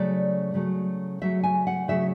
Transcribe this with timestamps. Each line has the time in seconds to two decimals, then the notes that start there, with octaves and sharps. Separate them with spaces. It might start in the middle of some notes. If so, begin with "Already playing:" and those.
Already playing: C#3 F#3 A3 D5
0.54 C#3 F#3 A3
1.21 C#3 F#3 A3 E5
1.44 G#5
1.67 F#5
1.88 C#3 F#3 A3 E5